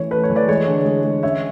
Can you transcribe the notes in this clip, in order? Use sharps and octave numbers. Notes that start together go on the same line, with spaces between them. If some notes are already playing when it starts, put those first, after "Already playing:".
Already playing: E3 A3 C#4 C#5
A3 B4
C#5
E3
B4 D5
G#3 C#5
D3
G#3
G#3
C#4 C#5 E5